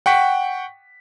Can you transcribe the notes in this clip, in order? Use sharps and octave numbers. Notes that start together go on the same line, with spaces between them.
F#5 G5 C#6 B6